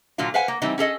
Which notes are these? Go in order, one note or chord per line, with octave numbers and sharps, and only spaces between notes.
A#2 D3 F#3 A#3 F4
B4 C5 F5 F#5 G#5
A#3
E3 G3 C4 D#4
C#4 G#4 A4 D#5